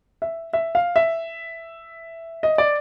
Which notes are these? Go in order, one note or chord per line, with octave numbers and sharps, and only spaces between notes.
E5
E5
F5
E5
D#5
D5